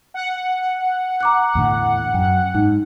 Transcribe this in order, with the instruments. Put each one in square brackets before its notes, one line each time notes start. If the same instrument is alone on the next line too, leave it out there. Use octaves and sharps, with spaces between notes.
[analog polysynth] F#5
[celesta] A#5 D6 F#6
[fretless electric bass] E2 A2 D3
[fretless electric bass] F#2 [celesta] G5
[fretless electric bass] G#2 [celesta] D#4